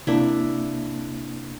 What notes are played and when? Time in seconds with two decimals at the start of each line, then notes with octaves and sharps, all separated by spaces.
0.07 C3 A#3 D4 E4